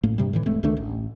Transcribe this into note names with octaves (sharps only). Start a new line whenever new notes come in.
A1 A2 A3 A#3
G2 C3 G3
A2 D#3 E3
F1 G#3 A3 C4
C#2 D#3 A3 D4
A1